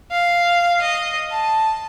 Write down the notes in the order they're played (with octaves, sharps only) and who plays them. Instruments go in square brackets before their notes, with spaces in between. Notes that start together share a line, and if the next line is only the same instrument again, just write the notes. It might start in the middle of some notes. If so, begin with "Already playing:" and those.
[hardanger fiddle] F5
D#5
A5